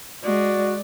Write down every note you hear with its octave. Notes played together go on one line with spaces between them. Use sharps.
G#3 F#4 D5